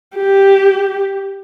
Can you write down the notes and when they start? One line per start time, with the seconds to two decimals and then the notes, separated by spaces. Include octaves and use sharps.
0.17 G4